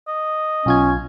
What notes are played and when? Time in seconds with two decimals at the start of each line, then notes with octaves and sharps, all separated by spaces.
0.08 D#5
0.66 B1 C#4 F4 G#6